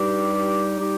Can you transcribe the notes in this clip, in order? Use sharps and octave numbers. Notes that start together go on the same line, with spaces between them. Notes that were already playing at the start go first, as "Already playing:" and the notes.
Already playing: G2 G3 D#4 G4
G3 D#4 G4